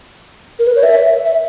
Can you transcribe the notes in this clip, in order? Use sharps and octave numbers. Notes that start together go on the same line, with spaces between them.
A#4
B4
C#5
E5
E5